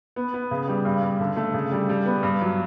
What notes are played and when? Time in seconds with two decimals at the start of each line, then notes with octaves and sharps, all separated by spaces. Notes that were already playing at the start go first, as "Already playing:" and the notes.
0.16 B3
0.34 B3
0.51 C#3
0.68 G3
0.85 G2
1.02 G2
1.20 D3
1.36 A3
1.54 C#3
1.72 G3
1.89 G3
2.06 B3
2.23 G2
2.41 F#3